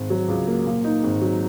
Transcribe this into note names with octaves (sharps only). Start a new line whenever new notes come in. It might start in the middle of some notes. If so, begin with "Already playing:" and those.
Already playing: G#1
F#3
C#2
A#3
A#2
D#4
G#1
F#3